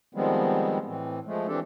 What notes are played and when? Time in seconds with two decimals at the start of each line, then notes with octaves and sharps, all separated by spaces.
0.15 D#3 F3 G3 G#3 B3 C4
0.86 A2 E3 C4
1.26 F3 G#3 A3
1.47 E3 C4 D4 G4 A4